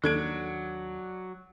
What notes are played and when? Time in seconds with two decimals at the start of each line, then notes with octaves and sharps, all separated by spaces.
0.04 D#2 F#3 D4 A4 G#6 D7